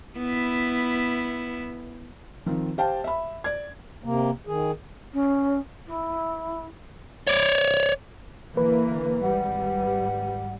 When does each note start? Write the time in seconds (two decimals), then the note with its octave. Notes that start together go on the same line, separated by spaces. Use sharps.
0.18 B3 E4
2.46 D#3 F3 C4
2.78 G4 C5 F5 G5 A5
3.04 E5 B5
3.44 D5 G#6
4.04 C3 A#3
4.47 D#3 G#4
5.13 C#4
5.87 E4
7.27 C#5 D5
8.57 D3 E3 A#3 B4
9.23 G#1 G3 F#5